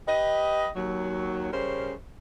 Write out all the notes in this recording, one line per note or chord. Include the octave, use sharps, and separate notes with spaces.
G4 B4 D#5
D#2 F#3
C#3 G3 C#4 A#4 C5